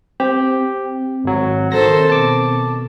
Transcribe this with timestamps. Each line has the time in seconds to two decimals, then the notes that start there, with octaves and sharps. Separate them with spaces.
0.20 C4 G4
1.24 G#1 F#3
1.72 D#3 A4 C5 A#6
2.10 B2 A5 D6